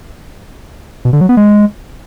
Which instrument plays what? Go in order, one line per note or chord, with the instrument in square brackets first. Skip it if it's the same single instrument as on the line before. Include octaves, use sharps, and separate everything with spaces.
[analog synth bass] B2
D3
F#3
B3
G#3